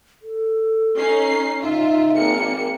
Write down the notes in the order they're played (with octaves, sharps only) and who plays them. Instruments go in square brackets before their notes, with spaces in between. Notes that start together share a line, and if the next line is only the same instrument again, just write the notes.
[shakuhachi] A4
[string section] C#4 D#4 C7
[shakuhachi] D#4 [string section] F4 E5
[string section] G#1 A#3 C#7